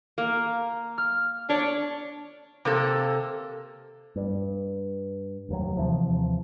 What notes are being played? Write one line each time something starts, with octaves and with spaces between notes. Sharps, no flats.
A#3
F6
D4 C#5
C3 A#3 A4
G2
F1 D#2 F#3
D#2 C3 E3 F3